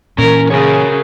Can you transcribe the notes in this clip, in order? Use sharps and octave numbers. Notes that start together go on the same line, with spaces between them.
A#2 E3 C#4 A#4
C#3 G#4 A#4 C#5